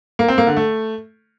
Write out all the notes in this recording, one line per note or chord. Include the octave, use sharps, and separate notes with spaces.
A#3
C4
A#3
D3
A3